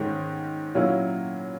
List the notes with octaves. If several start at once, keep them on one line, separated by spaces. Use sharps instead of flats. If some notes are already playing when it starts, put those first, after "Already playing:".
Already playing: G#2 D#3 G#3 C#4
A#2 F#3 A#3 C#4 E4